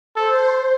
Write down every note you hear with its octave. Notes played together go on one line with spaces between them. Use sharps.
A4 C5